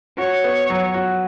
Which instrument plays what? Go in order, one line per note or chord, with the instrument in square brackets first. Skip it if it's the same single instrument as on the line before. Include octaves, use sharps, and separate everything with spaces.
[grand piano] F#4 [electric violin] C#5
[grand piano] B3
F#3
F#4